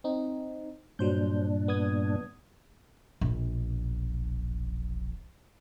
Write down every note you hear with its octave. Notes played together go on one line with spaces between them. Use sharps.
C4 D#4
G2 A#2 F#3 D4 C5 G6
B3 D#6 G#6
E1 A#1